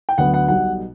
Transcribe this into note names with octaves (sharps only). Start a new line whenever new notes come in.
G5
D2 D3 F#3 B3 F#5
F#5
B1 B2 G3 B3 F#5